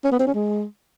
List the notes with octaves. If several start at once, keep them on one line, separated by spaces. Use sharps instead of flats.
C#4
B3
C4
C#4
G#3